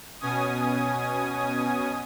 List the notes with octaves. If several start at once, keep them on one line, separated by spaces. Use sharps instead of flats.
B2 C#4 G#5 D#6